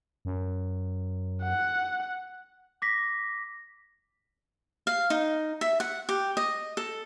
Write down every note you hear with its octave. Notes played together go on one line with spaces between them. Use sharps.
F#2
F#5
D6 A#6 B6
F5
D#4
E5
F#5
G4
D#5
A4